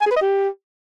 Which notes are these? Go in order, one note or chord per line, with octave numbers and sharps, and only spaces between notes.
G#5
G#4
B4
D#5
G4